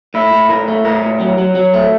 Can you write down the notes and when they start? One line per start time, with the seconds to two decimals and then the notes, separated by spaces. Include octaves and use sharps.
0.14 A2 E4
0.32 A2
0.49 A2 A#4
0.68 A3
0.85 A2 A#4
1.02 A2
1.20 F#3
1.38 F#3
1.55 F#3
1.74 A3